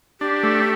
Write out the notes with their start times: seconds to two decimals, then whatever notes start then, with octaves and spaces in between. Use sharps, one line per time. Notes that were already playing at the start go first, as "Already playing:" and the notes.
0.20 D4 G4
0.43 A3